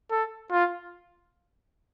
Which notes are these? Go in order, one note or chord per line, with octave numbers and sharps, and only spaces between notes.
A4
F4